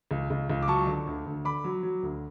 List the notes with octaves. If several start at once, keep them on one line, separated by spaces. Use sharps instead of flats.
C#2
C#2
C#2
D6
F#3 A5 C#6
D3
D2
D2
D3 B5 D6
F#3
F#3
D2